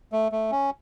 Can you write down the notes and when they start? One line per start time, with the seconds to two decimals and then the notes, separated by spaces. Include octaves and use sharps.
0.12 A3
0.32 A3
0.51 C#4